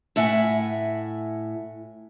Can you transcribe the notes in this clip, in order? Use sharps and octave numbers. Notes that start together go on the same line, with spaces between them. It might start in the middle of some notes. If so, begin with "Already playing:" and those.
A2 E5 F#5 G#5